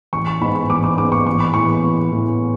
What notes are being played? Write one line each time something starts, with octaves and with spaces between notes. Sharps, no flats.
A1 C#6
C#6
G#2 G#3 B3 B5
C#6
A1 D6
D6
G#2 G#3 B3 D6
C#6
A1 C#6
B5
A2 E3 B3 C#6
A1
A2 E3 B3